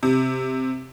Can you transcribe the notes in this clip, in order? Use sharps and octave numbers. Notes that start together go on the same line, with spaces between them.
C3